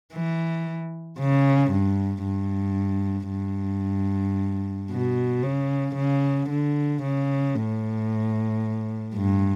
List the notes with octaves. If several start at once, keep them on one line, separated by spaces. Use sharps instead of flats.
E3
C#3
G2
G2
G2
B2
C#3
C#3
D3
C#3
A2
G2